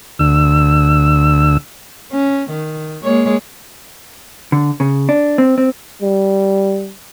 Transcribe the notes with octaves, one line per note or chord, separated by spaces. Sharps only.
D2 E6
C#4
D#3
G#3 A#3 C#5
D3
C#3
D4
C4
C4
G3